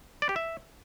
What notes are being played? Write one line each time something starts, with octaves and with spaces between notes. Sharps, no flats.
D5
G4
E5